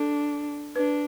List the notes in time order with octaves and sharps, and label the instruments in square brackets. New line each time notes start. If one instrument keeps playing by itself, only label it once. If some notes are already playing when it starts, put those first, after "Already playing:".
Already playing: [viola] D4 [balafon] A4
[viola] D4 [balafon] B4